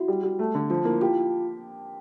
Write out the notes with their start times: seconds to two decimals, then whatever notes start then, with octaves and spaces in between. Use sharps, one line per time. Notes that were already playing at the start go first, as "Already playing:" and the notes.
Already playing: E4 F#4
0.08 G3
0.23 G3
0.39 A3
0.55 D3
0.70 F3 F4
0.85 A#3 E4
1.01 F4 G4